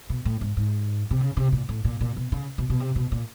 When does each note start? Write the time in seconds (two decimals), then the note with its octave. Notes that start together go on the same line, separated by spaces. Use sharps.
0.10 B2
0.25 A2
0.41 G#2
0.57 G#2
1.11 C3
1.21 C#3
1.37 C3
1.52 A#2
1.69 A2
1.85 A#2
2.01 A#2
2.16 B2
2.32 C#3
2.58 B2
2.70 B2
2.80 C3
2.96 B2
3.12 A#2